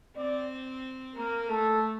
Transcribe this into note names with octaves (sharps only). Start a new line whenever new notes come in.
C4 D5
A#3 A#4
A3 A4